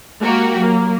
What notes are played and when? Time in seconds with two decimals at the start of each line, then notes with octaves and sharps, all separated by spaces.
0.21 G#3 A#3 F#4 G4
0.57 F#3 A#3